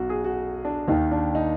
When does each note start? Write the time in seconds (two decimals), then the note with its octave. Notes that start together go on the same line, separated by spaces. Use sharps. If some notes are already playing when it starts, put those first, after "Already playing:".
Already playing: B1 F#4
0.10 G#4
0.24 F#4
0.65 D4
0.88 D#2 D#3 D#4
1.11 D4
1.35 D#4